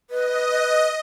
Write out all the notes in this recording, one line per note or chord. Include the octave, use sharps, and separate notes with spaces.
B4 D#5